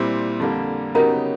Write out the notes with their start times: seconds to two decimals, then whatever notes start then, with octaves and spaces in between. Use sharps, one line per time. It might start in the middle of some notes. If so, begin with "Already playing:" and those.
Already playing: A#2 G3 C4 E4
0.39 F2 D3 G3 A#3
0.94 C#3 F#3 B3 D#4 G4 A#4 A#5